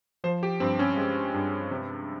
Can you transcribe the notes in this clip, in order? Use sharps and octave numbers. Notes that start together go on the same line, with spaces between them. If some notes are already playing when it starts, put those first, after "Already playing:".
F3 C5
G4
G2 C4
C#4
G#3
G2
C3